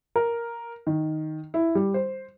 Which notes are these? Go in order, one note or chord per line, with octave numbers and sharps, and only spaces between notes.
A#4
D#3
E4
G3
C5